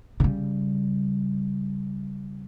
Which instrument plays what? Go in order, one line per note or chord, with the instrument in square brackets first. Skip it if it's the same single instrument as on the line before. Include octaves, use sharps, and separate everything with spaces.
[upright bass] C#3 G3